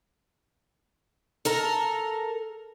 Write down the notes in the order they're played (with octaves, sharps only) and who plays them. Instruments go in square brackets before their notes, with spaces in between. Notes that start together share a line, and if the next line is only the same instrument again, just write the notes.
[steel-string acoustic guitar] A4 A#4 A#5